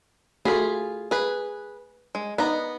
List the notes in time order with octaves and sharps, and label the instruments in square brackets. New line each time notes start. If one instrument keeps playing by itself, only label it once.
[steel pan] A3 F#4 B5 [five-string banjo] F4 G#4
[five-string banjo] G#4 B4
G#3
[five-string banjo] B3 A#5 [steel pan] D#4 D5